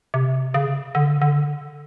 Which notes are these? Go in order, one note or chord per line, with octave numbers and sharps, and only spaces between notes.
C3
C#3
D3
D3